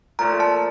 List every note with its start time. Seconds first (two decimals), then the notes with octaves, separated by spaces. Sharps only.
0.19 A#2 F3 A3 A#5
0.40 A5